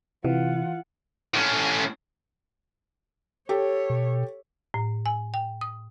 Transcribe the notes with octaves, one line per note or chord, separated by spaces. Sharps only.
C3 E3 F4 F#5
A2 C#4
G4 A4 C#5
B2
A2
G#5
G5
D#6